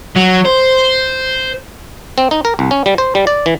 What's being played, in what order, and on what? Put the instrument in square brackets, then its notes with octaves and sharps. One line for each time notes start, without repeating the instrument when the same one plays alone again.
[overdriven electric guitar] F#3
C5
[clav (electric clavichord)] C4
D#4
A#4
C2
C#4
G3
C5
G3
D5
E3